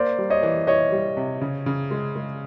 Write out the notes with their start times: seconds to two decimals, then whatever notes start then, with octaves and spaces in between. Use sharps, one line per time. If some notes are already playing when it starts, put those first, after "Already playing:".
Already playing: A#3 C5 D5
0.18 G3
0.30 C#5 D#5
0.43 E3
0.67 E3 C#5 D#5
0.92 G3
1.17 C3
1.41 C#3
1.66 C#3
1.91 G#3
2.16 G#3